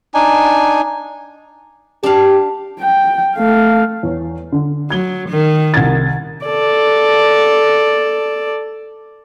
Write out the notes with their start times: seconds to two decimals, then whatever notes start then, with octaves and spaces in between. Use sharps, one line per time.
0.14 D4 D#4 G#5
2.03 D4 G4 F5
2.80 G5
3.35 A3 F5
4.03 E2 C#5
4.52 D3
4.90 F#3 G#6 G7
5.29 D#3
5.74 C2 G#6 A6
6.46 A4 D5